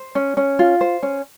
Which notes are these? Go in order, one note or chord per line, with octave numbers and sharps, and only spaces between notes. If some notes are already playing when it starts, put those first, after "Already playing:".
Already playing: C5
C#4
C#4
F4
C5
C#4